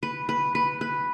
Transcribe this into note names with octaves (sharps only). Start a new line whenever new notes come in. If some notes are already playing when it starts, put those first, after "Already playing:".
B4
B4
B4
B4